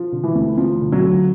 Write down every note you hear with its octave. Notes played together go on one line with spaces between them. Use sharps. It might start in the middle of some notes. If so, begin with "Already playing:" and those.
Already playing: F3
D3
E3
D2
D2 F3
D3
F#3
D3